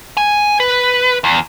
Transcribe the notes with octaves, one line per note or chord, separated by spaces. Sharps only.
G#5
B4
E2